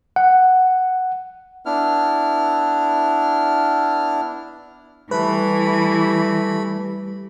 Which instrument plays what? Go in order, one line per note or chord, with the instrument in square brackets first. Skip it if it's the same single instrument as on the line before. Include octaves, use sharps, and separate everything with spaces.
[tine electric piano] F#5
[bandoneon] B3 D4 E4 F6
[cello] E3 [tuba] G3 [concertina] A3 B5 [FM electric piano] B4